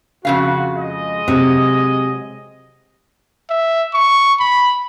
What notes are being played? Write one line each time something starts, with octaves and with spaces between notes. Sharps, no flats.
F2 C#3 F#4 F5
G#3 D#5
C3 F#3
E5
C#6
B5